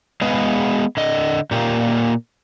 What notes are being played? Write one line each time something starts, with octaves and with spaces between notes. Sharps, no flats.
G#3 B3 G#4 B4 D#5 F5
D3 D#5
A#2 A#3 G4